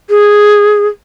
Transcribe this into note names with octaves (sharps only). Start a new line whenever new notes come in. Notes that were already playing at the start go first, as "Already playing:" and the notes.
G#4